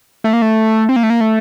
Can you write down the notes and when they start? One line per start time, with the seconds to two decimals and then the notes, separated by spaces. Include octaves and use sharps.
0.24 A3
0.33 A#3
0.42 A3
0.89 C4
0.96 A#3
1.03 A3
1.10 A#3
1.21 A3